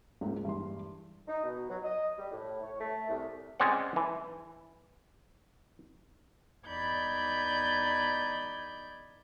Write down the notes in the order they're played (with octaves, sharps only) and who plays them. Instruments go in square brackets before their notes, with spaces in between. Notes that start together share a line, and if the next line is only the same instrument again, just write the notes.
[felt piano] C#2 G#2 A#3
G2 E3 C6
[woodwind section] D#4
B2
F#3
D#5
G3
A2
C#5
A3
C2
[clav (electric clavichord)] G#3 C4 C#4 D5 F#5
E3
[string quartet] E2 D#4 D5 B5 G6 G#6